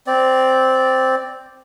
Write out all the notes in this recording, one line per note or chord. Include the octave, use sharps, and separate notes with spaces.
C4 D5